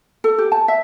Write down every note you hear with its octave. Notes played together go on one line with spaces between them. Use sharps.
A4
G4
A5
E5